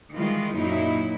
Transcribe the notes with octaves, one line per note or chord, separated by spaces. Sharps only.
D#3 E3 G3 G#3 F4
F#2 A#2 F#3 D#4 E4